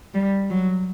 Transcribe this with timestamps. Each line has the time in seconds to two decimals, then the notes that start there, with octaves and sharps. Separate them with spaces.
0.14 G3
0.50 F#3